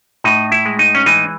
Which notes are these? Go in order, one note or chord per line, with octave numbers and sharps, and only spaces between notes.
A2 D#4
E4
G#3
D#4
C#4
E3 D#4